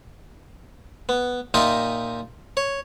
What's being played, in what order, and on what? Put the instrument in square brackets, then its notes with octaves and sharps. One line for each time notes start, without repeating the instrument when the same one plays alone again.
[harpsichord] B3
A#2 D#4 F4 G4 D#5 E5
C#5